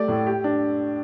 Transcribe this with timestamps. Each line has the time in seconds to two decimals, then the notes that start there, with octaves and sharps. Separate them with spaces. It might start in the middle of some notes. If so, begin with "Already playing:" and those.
Already playing: A3 G4 D5
0.08 A2
0.26 G4
0.44 D4